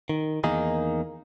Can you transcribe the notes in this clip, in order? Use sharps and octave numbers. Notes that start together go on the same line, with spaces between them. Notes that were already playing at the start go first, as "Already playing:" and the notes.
D#3
E2 D#3 A#3 D#4 G#4